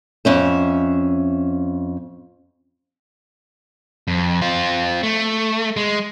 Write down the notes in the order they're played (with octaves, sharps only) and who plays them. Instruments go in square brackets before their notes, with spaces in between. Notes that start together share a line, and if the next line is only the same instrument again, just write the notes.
[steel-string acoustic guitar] F2 C#4 E5
[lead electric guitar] F2
C4 F4
A3
G#3